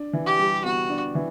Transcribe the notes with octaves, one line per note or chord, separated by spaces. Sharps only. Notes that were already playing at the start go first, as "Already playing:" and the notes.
Already playing: D4
E3
G4
G3
B3 F#4
D4
E3